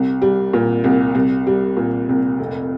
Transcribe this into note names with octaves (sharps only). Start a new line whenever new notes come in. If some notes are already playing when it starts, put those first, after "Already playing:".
Already playing: C2
G3
A#2
C2
C2
G3
A#2
C2
F1